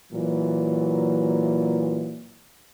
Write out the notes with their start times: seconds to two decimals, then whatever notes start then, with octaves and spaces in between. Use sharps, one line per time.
0.12 A#2 E3 F#3